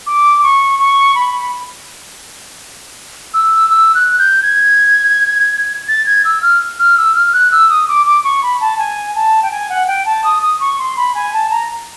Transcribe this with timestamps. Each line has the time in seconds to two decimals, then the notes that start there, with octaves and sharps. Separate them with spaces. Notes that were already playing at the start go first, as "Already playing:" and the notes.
0.07 D6
0.43 C#6
0.79 C#6
1.15 B5
3.34 E6
3.70 E6
3.95 F#6
4.19 G6
4.43 G#6
5.88 A6
6.06 G#6
6.25 E6
6.42 F6
6.79 F6
6.97 E6
7.15 F6
7.33 F#6
7.52 E6
7.70 D#6
7.88 D6
8.06 D6
8.24 C#6
8.43 B5
8.61 A5
8.78 G#5
9.15 A5
9.43 G5
9.51 G#5
9.70 F#5
9.87 G5
10.06 A5
10.24 D#6
10.43 D#6
10.60 C#6
10.79 C6
10.96 B5
11.15 G#5
11.33 A5
11.51 A#5